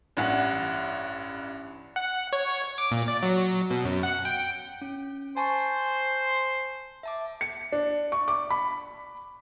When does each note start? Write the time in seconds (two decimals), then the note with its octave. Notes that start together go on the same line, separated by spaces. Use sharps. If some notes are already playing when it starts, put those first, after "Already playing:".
0.17 A1 G2 F#5
1.96 F#5
2.33 C#5
2.78 D6
2.91 A#2
3.08 D5
3.23 F#3
3.70 B2
3.85 F#2
4.03 F#5
4.25 G5
4.81 C#4
5.37 C5 G#5 A5 C#6
7.03 E5 A5 D6
7.41 C#7
7.72 D4
8.12 C#6
8.28 D6
8.51 B5